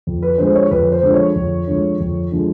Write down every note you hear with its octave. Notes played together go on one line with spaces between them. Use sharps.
F2
B4
D3 F3 G#3 C5
C#5
F2 B4
C5
D3 F3 G#3
C#5
F2
D3 F3 G#3
F2
D3 F3 G#3